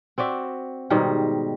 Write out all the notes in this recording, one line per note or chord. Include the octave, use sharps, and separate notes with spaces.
C4 F#4 D5 E5
G#2 B2 D#3 G3